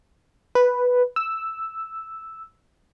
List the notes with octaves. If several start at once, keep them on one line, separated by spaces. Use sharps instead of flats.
B4
E6